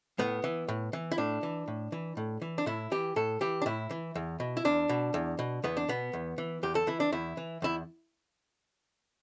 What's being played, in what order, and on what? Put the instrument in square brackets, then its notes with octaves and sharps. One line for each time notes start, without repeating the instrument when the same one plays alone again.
[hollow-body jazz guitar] A2 B3
E3
A2
E3
E4
A2 D4
E3
A2
E3
A2
E3
D4
A2 E4
E3 G4
A2 A4
E3 G4
D4
A2 E4
E3
E2
B2
E4
E2 D4
B2
E2
B2
E2 B3
D4
B2 B3
E2
E3
E2 G4
A4
E3 E4
D4
E2 E4
E3
E2 E4